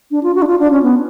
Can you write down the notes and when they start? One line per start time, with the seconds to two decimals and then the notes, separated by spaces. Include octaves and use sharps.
0.11 D4
0.23 F4
0.35 F#4
0.42 D4
0.47 F4
0.59 D4
0.71 C#4
0.83 B3